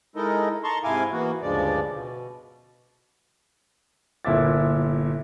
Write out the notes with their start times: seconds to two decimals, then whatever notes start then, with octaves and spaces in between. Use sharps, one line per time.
0.16 G#3 D#4 E4 A4 A#4 D#5
0.64 A5 A#5 C6 C#6
0.84 G#2 C3 E4 F5 G#5 D6
1.12 E3 A#3 B3 F#4
1.42 D2 G2 C#3 F3 G#3 D5
1.91 B2
4.25 G1 A#2 E4 E5 D6 A6